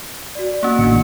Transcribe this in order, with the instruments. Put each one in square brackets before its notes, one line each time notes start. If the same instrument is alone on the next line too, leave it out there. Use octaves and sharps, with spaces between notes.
[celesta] F#4 D5
[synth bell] A#3 C#4
[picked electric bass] G#1 A2 D#3 [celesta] D4 C#7